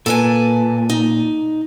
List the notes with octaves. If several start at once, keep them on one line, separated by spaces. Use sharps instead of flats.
A#2 A4 B4 G#5
D#4